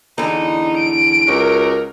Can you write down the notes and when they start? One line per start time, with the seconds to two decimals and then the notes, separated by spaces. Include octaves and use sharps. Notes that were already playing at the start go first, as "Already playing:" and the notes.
0.18 E2 D3 D#4
0.76 D7
1.27 C#2 F#4 A#4